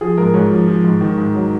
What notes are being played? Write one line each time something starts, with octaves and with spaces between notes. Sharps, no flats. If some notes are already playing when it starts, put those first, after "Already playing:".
F3 G#4
G#2 A#4
G#2 C#5
F3
F3
G#2
D#3
G#2
F#3